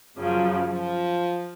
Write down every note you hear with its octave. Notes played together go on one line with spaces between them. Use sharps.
F#2 C#3 F3 F#3
F3